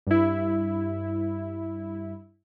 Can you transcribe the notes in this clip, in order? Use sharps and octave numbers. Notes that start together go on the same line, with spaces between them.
G2 E4